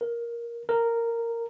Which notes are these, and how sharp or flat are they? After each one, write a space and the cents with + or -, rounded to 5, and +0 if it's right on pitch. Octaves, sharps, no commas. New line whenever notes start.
A#4 +10
A#4 -10